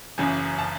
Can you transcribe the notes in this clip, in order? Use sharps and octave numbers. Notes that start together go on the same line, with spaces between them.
F#1 F#2 C#3 E3 G#5
A5